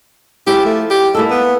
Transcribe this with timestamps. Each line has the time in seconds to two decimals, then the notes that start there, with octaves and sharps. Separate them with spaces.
0.47 F3 G#3 E4 G4
0.65 A3
0.90 G4
1.15 G#3 A#3 E4 A4
1.30 B3